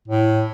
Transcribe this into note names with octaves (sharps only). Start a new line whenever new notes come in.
A2